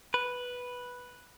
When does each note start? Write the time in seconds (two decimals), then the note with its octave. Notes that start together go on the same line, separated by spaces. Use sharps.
0.14 B4